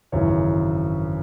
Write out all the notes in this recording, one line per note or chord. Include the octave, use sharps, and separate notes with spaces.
G#1 F#2 C#3 E3 C#5